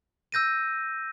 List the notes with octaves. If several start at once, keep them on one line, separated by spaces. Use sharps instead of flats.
E6 G6 A#6 D#7